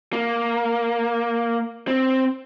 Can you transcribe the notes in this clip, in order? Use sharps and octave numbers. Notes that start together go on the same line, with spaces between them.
A#3
C4